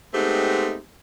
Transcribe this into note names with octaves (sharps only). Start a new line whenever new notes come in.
G#3 A3 B3 C4 D#4 G4